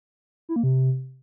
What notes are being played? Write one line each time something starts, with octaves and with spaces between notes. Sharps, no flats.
E4
A#3
C3